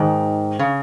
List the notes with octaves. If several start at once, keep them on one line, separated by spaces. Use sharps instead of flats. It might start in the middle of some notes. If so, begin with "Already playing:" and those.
Already playing: G#2 D#3
C#3